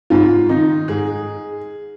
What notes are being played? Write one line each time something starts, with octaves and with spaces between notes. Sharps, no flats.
G#2 F4
D#3 D#4
G#2 G#4